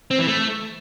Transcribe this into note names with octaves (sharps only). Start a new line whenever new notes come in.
C4
E3
A3